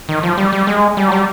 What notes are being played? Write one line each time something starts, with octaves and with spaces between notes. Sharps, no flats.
D#3
F3
G3
G3
G#3
G3
F#3
G3